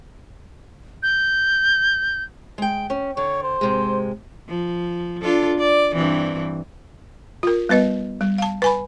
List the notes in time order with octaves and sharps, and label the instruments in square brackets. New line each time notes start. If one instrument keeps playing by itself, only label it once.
[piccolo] G6
[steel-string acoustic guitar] G#3 G5
C#4
[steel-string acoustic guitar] D3 [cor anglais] C#5
[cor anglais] C5
[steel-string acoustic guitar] G#2 C3 G#3
[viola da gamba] F3
D4 F4 A4
D5
G2 E3 C4
[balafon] F4 A#4
G3 B3 B4 D#5
G3
F5 A5
B4 G#5 B5